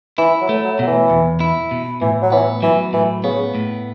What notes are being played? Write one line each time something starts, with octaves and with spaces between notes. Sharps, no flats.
E3 E4
F#3
A3
F#3
B2 F#3
E3
E2
E4
B2
A2 E3
F#3
E3 B3
E3 F#3
A2 E3
C#3 B3
A2